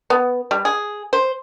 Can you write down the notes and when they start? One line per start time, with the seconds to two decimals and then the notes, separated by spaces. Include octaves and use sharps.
0.10 B3
0.51 G3
0.65 G#4
1.13 C5